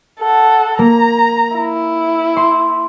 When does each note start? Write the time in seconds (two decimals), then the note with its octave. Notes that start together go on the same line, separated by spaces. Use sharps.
0.19 A4 F#5
0.79 A#3 A#5
1.56 E4
2.37 C6